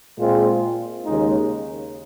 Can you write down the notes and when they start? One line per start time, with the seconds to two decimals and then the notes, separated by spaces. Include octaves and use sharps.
0.17 A#2 G#3 C4 F4
1.05 D#2 C#3 G#3 D#4